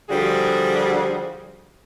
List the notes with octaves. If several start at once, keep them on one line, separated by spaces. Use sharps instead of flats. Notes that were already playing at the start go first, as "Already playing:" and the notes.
D3 F3 G3 F#4 G#4